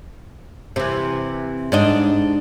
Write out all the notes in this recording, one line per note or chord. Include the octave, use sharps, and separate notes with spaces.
C3 E3
G#2 D4 D#5